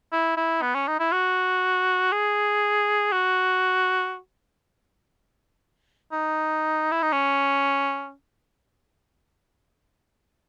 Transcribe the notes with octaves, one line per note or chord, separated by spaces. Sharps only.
E4
E4
B3
C#4
D#4
E4
F#4
G#4
F#4
D#4
E4
D#4
C#4